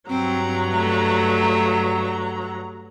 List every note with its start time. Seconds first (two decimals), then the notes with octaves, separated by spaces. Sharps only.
0.10 G2 F#3 C4 A#5
0.75 A3